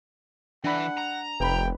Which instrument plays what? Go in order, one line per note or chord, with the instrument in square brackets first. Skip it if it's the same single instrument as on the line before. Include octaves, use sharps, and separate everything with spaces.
[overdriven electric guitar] E3 [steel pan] D4 B5 [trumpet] F#5
[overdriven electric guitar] A#5
[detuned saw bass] F1 [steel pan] B4 B5 [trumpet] G5